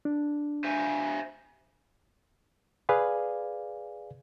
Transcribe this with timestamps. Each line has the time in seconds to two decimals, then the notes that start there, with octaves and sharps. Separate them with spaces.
0.05 D4
0.64 C5 E5 G#5
2.89 G#4 B4 D5 F5 G#5